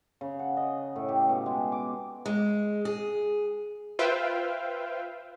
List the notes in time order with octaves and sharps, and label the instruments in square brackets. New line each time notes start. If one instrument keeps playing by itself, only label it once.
[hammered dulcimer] C#3
F#5
D#5
A2
G4
B2
G#3
D6
[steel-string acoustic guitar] G#3
G#4
[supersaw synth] F4 B4 C5 E5 F5 G5